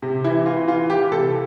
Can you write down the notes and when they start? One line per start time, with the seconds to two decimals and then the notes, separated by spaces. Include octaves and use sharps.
0.02 C3
0.24 E3 E4
0.46 E3 F4
0.67 E3 F4
0.90 E3 G4
1.12 C3 A4